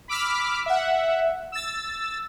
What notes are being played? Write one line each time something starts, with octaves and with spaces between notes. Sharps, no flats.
B5 D6 E6 F6 B6
E5 F#5
E6 A6